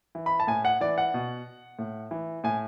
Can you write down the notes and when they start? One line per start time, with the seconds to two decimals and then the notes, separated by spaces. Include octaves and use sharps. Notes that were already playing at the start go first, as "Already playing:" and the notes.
0.15 E3
0.26 B5
0.40 A5
0.47 A2 G#5
0.65 F#5
0.81 E3 D5
0.98 F#5
1.14 B2
1.79 A2
2.11 E3
2.44 A2 G#5